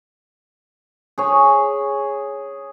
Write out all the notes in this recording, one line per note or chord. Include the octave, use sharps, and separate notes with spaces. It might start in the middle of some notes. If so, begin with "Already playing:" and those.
G#4 C#5